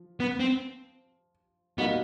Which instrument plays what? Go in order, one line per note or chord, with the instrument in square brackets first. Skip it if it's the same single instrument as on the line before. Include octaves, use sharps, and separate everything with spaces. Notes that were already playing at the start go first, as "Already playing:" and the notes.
Already playing: [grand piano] F3
[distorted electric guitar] B3
C4
[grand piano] B2 G3 A#3 D#4 F#4 [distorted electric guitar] B3